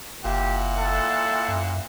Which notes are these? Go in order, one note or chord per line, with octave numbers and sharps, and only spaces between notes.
F#1 A#2 E4 G4 F#5
A4
F#2